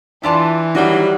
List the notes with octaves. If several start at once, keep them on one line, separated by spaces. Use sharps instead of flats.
E3 D4 F4 D5 E5 A5
D#3 F#3 G3 E4 D#5 F#5